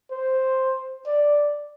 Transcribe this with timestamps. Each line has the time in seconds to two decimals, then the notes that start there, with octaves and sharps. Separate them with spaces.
0.11 C5
1.06 D5